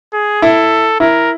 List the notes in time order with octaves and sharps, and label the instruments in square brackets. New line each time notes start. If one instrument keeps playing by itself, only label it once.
[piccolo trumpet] G#4
[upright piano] E4 [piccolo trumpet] A4
[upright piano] E4 [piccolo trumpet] A#4